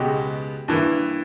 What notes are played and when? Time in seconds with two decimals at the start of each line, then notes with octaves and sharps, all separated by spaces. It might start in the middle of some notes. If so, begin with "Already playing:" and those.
Already playing: C#2 B2 G#3 B3 G4
0.68 G2 E3 A#3